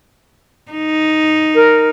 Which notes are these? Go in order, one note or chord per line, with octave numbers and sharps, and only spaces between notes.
D#4
A#4